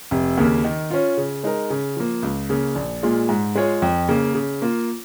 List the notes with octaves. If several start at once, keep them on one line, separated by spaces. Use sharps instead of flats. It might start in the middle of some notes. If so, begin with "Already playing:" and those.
F1
D#2 C#3 A#3
D#3
C#4 F4
C#3
G#3 D#4 A#4
C#3
F3 A#3
C#2
C#3 A#3
A#1
A#2 G#3 F4
G#2
G#3 F4 G#4 C#5
F2
C#3 A#3
C#3
A#3 F4